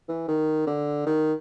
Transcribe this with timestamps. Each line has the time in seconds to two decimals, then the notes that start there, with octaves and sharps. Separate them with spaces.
0.09 E3
0.28 D#3
0.67 D3
1.06 D#3